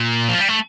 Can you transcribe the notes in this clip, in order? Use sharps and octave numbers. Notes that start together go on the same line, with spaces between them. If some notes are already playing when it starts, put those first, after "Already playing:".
Already playing: A#2
F3
G3
A3